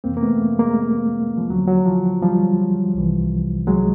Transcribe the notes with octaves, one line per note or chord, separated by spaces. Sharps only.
F2 C3 E3 A#3 C4
A#3
A3 B3
G#3 A#3
F3
D#2 D3 F3 F#3
F#3
F3
F3 G3
C2 C3 E3
F#3 G#3